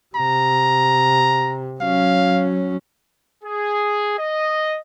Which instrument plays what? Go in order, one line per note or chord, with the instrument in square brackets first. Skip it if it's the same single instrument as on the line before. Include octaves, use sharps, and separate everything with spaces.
[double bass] C3 [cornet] A#5
[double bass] F#3 C#4 [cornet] F5
[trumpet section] G#4
D#5